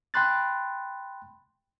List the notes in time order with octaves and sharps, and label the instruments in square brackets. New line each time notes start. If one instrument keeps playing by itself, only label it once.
[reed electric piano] G5 B5 C6 F#6 A6